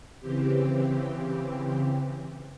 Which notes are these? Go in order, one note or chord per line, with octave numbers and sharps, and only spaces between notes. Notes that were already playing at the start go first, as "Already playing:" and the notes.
C#3 E3 C4 G4